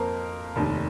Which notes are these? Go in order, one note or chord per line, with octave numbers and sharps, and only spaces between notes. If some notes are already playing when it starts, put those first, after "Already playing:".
Already playing: F2 A#3 A#4 C5
F1 D#2 D#3